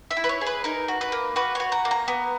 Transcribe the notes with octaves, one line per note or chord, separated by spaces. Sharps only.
E5
E4
B4
C#5
G#4
B4
D#4 A#4
F#4
B4
A#3
F#4 B4
F#4 C#5
A#5
A#3
A#5
B3